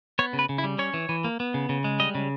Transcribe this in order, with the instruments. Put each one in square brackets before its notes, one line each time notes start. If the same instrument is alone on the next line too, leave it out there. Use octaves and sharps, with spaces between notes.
[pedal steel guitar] B3 C#5
C#3
B4
C#3
E4
G3
C#4 C#5
E3
E3
A#3
B3
C#3
C#3
G#3
G3 D#5
C#3